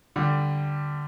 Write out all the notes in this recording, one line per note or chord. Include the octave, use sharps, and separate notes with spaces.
D3 G3